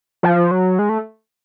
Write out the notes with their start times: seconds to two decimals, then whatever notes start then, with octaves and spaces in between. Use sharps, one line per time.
0.23 F3
0.51 F#3
0.79 G#3
0.89 A3